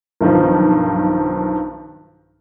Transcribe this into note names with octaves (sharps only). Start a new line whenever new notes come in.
B1 G2 D#3 F3